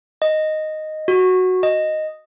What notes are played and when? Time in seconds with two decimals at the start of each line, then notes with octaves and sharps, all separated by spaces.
0.22 D#5
1.08 F#4
1.63 D#5